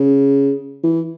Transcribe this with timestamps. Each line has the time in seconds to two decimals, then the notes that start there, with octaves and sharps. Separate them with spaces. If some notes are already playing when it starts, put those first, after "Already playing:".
Already playing: C#3
0.84 E3